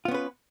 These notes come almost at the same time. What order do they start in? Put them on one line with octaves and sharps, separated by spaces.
F4 B3 C#4 B4